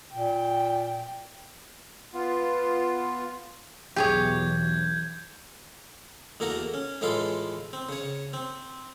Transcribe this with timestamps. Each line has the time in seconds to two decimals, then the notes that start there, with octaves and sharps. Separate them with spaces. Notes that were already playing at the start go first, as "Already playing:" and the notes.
0.14 A#2 G5
2.14 B3 F4
3.96 B1 E2 G4 G#4 C#5 G6 G#6
6.40 E2 A3 A#3 F#4 A#5
6.74 C#4
7.01 A2 E3 G#3 F4 A4 C6
7.73 C4
7.89 C#3 C#5
8.33 C4